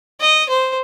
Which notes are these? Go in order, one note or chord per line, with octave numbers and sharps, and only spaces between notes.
D#5
C5